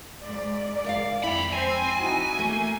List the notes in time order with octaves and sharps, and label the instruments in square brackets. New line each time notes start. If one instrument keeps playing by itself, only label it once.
[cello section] G#2 D5
[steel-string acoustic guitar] A#4 E5 F5
[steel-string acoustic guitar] F2 E4 G5 [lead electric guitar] D#3 B5
[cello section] C4 C5 [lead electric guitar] G#5
[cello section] D#4 E4 F#4
[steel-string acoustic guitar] A3 [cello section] A#3